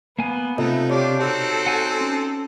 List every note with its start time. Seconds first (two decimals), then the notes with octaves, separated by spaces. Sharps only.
0.19 A#3 B3 G#5
0.58 C3 A3 B3 D#4 F4 A4 D#5
0.90 D4 F4 G4 C#5
1.20 C4 D#4 F#4 A4
1.66 F#5 G#5
2.01 C#4